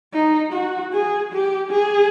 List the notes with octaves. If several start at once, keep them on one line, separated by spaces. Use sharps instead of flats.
D#4
F#4
G#4
G4
G#4